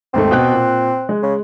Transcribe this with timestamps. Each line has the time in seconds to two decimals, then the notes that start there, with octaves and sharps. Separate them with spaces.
0.14 D#2 G#2 A3 C4
0.31 B2 G5 F#6
0.52 A#2
1.09 G#3
1.22 C#3